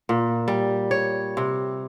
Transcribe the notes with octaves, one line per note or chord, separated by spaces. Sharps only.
A#2
G3
C#5
C3